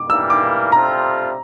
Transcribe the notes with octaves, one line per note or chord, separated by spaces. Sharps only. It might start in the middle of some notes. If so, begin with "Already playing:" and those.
Already playing: D6
E3 G3 A#3 E6
D6
C3 G3 C4 F4 A4 A#5